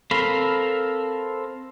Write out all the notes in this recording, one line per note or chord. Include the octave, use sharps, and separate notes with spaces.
C4 A4 A#4 F5 B5